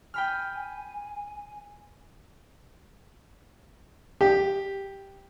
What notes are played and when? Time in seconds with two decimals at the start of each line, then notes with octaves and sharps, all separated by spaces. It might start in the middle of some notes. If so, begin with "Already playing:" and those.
0.14 G5 G#5 B5 F6
4.21 G4